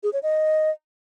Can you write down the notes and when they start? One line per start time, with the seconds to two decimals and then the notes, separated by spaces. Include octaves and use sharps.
0.03 G#4
0.13 C#5
0.23 D#5